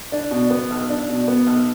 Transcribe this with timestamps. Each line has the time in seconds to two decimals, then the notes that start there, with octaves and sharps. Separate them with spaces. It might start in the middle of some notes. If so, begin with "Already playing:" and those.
0.12 D4
0.31 B2
0.50 B3
0.70 B1
0.89 D4
1.09 B2
1.28 B3
1.46 B1